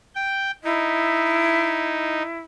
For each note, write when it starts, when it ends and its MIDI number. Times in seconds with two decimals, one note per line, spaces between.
0.15 0.51 79
0.64 2.22 63
0.64 2.39 64